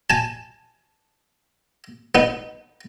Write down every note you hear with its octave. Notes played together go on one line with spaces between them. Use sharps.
G#5 A5
B3 D#4